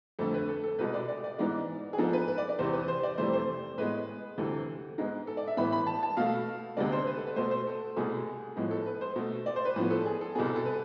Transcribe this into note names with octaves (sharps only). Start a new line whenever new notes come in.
F2 D3 A3 A4
B4
A4
A4
C2 B2 G#3 B3 B4
D5
D5
D5
G#2 E3 G#3 B3 D5
G#4
G#2 F3 B3 A4
B4
B4
D5
D5
E2 C3 E3 C5
B4
C5
D5
F2 C3 E3 A3 C5
C5
A2 G#3 B3 B4
D2 C3 E3 A4
G#2 G#3 B3
A4
D5
E5
A2 E3 B3 B5
B5
A5
A5
B2 A3 F5
D2 C3 G#3 B3 D5
C5
B4
A4
B4
B2 A3 C5
C5
A4
C2 B2 A3 G#4
A2 F3 G#3 B3
A4
B4
C5
B2 A3
D5
C5
B4
A2 F3 B3 B4
A4
G#4
A4
C2 B2 B3 G#4
A4
A4
B4